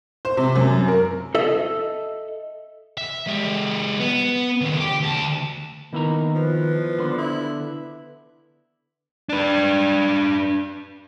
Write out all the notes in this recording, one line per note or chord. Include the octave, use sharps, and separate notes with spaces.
C5
C3
F#2
A#4
A4 D#5 E5
E5
G#3 G4
B3
D#2 D3
G4
D2 A5
D#3 A#3 B3 E4 A#5
F3 B4
D3 B3 C6
E4
D4 B4